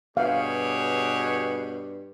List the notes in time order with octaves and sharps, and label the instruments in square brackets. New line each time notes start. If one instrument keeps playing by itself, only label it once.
[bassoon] G2 [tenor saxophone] B2 [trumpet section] G4 G#4 C#5 [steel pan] F5